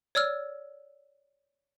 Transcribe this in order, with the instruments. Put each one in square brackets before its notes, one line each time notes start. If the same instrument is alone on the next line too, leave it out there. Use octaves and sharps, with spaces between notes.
[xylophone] C#5 D5 E6 F6